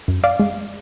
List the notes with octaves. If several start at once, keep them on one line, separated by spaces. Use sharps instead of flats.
F#2
D5 F5
G#3